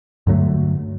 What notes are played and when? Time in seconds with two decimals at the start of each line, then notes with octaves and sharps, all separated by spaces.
0.27 G2 D3 F#3 A3